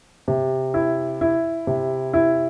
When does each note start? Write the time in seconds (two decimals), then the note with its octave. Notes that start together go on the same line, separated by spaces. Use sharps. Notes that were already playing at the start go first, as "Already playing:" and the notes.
0.28 C3
0.74 E4
1.21 E4
1.67 C3
2.14 E4